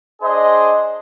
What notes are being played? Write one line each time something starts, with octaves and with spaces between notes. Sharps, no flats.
D4 G#4 C5 D#5